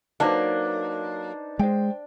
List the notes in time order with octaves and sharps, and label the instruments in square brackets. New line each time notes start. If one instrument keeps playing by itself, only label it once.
[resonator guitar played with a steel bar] F#3 A#3 [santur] D4 [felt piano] D#4 B4 C5
[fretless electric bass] G#3 [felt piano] C5 G5